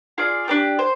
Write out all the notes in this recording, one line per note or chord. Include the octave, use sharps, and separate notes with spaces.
F4 G#4 D5
D4 G4 D5 G5
C5